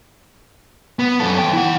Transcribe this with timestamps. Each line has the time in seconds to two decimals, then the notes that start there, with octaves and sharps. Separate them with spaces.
0.99 B3
1.20 F#2 A4
1.39 E2 G5
1.53 E4 F#5